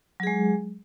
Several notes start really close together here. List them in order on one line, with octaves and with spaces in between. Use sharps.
F#3 G#4 G#3